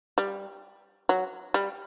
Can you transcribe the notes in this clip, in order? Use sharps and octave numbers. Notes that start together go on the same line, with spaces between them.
G3
F#3
G3